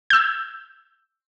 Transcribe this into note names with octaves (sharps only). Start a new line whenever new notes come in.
E6 G6